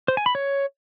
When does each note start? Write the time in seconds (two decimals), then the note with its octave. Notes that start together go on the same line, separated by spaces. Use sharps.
0.08 C5
0.17 G#5
0.26 B5
0.35 C#5